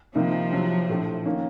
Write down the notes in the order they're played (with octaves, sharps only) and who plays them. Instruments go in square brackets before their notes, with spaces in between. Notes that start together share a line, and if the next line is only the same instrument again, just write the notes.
[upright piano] C2 C3 D#3 A#3 D#4 [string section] F3
[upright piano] C2 C3 F#3
A#1 A2 A3
D#3 A#3 C#4